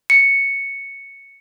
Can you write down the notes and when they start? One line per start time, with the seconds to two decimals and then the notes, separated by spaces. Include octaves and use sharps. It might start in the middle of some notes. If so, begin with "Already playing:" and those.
0.10 C#7